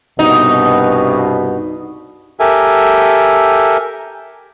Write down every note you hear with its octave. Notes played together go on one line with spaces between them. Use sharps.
C2 G2 B2 D#4
G4 A4 A#4 E5 G#5